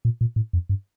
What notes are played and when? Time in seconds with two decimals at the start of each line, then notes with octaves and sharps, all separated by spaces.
0.05 A#2
0.21 A#2
0.36 A2
0.53 F2
0.69 G2